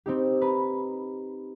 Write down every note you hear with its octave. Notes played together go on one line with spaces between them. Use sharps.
C4 D#4 G4
B4 A#5